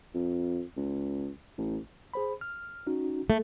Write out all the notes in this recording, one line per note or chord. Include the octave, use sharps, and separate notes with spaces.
F2
C#2
A1
G#4 C5 B5
F6
C#4 D#4 F#4
A3